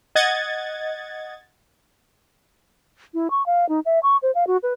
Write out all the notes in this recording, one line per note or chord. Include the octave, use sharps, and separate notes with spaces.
D#5 F#5 G#6 A6
E4
C#6
F5
D#4
E5
C#6
C5
F5
F#4
B4